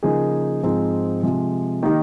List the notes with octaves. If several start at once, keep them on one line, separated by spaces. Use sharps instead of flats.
C#3 F3 A#3 D#4 G#4
G#2 F3 C4 D#4 G#4
C3 F3 G#3
D#3 A#3 D#4 G4